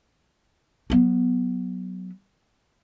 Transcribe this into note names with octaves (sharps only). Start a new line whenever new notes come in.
F#3 B3